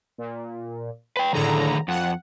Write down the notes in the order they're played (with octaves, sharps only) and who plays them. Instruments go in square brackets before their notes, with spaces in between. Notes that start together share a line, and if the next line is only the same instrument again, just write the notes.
[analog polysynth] A#2
[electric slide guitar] B4 G5
[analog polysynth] A2 D3 A#5 [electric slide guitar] D#3 G#4 A4
[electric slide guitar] F2 [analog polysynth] F#5